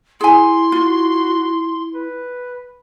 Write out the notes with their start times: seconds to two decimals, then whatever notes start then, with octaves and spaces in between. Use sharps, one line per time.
0.21 E4 G#4 G#5 C6
0.72 F4 F#4
1.94 B4